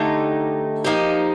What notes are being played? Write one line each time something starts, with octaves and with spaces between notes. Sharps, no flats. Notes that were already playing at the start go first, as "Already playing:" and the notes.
Already playing: D3 A3 D#4 G4
F3 A#3 D#4 G4